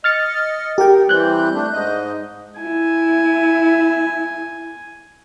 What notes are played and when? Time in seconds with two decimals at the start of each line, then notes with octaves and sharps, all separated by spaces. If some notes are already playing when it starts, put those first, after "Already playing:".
0.04 D#5 F6 A6 C#7
0.78 G4 A#4 G5
1.09 E3 G3 C4 F#6 G6
1.54 A3 D4
1.73 G#2 D#5
2.61 E4 G#5